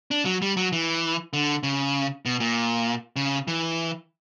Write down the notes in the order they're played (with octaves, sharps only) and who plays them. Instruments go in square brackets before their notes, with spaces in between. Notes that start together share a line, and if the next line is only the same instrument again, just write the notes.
[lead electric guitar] D4
F#3
G3
F#3
E3
D3
C#3
B2
A#2
C#3
E3